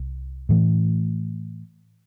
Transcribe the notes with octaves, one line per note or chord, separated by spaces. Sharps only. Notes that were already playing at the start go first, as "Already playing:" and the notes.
Already playing: C2
A2 E3 A3